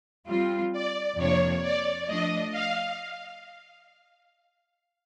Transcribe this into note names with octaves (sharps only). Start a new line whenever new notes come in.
G3 C4 F4
D5
F2 C3 F3 A#3 D4 C#5
D5
F3 A3 D4 D#5
F5